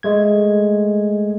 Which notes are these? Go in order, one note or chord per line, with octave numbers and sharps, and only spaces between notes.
G#3 A3 G#6